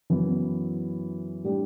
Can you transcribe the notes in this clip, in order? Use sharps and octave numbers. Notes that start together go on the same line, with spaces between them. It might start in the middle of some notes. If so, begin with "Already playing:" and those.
F#2 E3 B3 E4
A2 G3 D4 G4